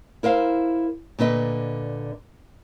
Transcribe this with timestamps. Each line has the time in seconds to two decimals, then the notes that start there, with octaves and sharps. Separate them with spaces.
0.23 E4 A#4 C5 F5
1.19 A#2 D3 B4 D#5